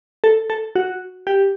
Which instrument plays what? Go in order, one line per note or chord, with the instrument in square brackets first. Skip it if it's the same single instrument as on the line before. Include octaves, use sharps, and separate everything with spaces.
[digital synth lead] A4
A4
F#4
G4